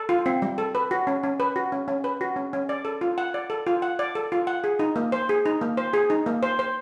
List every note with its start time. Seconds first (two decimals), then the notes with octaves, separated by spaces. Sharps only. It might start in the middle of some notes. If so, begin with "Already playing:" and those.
Already playing: A4
0.09 F4
0.26 C4
0.42 G3
0.58 A4
0.75 B4
0.91 F#4
1.07 C#4
1.23 C#4
1.40 B4
1.56 F#4
1.72 C#4
1.88 C#4
2.04 B4
2.21 F#4
2.36 C#4
2.53 C#4
2.69 D5
2.85 A4
3.01 F4
3.18 F#5
3.34 D5
3.50 A4
3.67 F4
3.82 F#5
3.99 D5
4.15 A4
4.32 F4
4.47 F#5
4.64 G#4
4.79 D#4
4.96 A#3
5.12 C5
5.29 G#4
5.46 D#4
5.61 A#3
5.77 C5
5.93 G#4
6.10 D#4
6.26 A#3
6.43 C5
6.59 C5